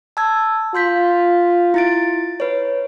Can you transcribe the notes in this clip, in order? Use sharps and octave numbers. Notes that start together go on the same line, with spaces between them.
A5 E6 G#6
F4 C6 G6 B6
E4 A6 D7
B4 C#5